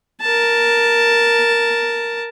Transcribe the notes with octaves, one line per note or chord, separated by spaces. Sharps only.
A#4 A5